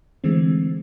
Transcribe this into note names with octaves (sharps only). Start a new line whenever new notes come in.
D3 E3 G#3 A3 C4